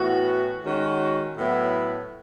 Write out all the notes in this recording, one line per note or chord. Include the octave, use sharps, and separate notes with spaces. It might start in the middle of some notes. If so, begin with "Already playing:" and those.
Already playing: A2 E3 B3 F#4
D#3 G#3 C#4 F#4
A2 F#3 B3 E4